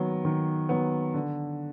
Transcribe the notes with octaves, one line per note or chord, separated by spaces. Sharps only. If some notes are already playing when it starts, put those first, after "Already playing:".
Already playing: D#3 F#3 B3
D#3
F#3 B3
D3